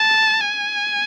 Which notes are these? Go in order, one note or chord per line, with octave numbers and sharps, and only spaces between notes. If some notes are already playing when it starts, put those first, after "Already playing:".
Already playing: A5
G#5